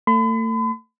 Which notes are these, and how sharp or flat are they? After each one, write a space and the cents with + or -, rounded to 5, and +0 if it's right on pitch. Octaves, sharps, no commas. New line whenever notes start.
A3 +35 B5 +40